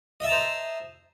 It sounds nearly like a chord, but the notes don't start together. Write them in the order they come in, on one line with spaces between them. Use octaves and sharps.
D#5 E5 A5 A#5 C5